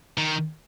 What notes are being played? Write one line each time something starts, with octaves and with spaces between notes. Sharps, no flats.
D#3